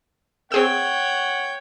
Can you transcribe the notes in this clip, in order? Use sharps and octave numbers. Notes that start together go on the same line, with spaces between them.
C4 G#4 C#5 F#5 G5 E6